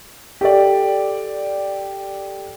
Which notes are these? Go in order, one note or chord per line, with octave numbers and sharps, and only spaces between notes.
G4 A4 D5